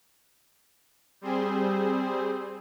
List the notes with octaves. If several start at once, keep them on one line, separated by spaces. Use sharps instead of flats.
G3 C4 G#4 C5